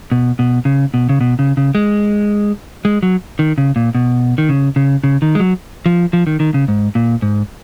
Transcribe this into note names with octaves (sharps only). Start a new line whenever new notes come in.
B2
B2
C#3
B2
C#3
B2
C#3
C#3
G#3
G#3
F#3
D#3
C#3
A#2
B2
D#3
C#3
C#3
C#3
D#3
G#3
F#3
F3
F3
D#3
D#3
C#3
G#2
A#2
G#2